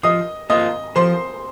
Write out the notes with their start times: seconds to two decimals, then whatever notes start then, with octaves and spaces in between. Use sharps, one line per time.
0.03 F3 D#5 D#6
0.50 A#3 F4 C5 D#5 D#6
0.96 F3 C5 C6